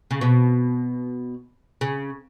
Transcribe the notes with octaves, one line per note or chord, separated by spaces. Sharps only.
C#3
B2
C#3